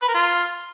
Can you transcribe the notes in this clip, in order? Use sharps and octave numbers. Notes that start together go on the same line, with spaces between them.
B4
A#4
F4